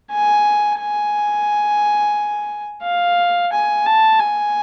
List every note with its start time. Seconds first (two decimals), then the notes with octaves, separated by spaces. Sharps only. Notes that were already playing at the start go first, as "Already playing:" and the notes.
0.11 G#5
0.80 G#5
2.84 F5
3.52 G#5
3.86 A5
4.20 G#5